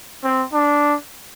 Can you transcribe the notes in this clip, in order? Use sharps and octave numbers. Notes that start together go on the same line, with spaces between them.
C4
D4